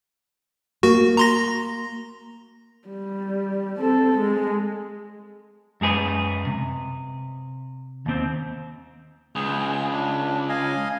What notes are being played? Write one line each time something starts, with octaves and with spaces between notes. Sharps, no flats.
A#3 F#4
A#5 C6 A#6
G3
C4 A4
G#3
F#2 G#3 G#4 B4
C3
D#2 C4
C#2 G#4
D4
D#5 F5 G#5